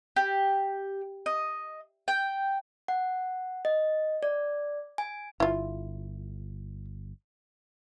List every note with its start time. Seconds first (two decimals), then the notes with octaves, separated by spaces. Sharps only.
0.16 G4
1.26 D#5
2.08 G5
2.88 F#5
3.65 D#5
4.23 D5
4.98 G#5
5.40 G1 E4 F4